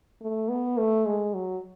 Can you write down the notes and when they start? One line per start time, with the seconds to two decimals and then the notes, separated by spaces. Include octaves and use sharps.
0.21 A3
0.50 B3
0.78 A3
1.06 G#3
1.34 F#3